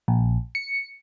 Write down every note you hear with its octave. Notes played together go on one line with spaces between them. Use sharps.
A#1
C#7